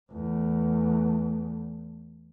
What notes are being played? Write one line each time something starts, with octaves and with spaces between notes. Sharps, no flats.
E2 A3